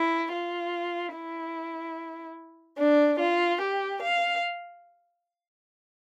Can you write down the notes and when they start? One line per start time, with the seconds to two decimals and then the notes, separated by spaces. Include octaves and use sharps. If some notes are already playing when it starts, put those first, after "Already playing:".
Already playing: E4
0.32 F4
1.14 E4
2.78 D4
3.19 F4
3.61 G4
4.02 F5